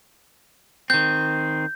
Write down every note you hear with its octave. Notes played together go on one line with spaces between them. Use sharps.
D#3 C4 G6